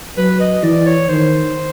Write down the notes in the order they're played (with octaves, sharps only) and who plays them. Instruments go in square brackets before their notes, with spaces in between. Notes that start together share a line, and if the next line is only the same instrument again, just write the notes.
[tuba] F#3 [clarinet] B4
[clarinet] D#5
[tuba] E3 [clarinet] D5
[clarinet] C#5
[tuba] D#3 [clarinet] C5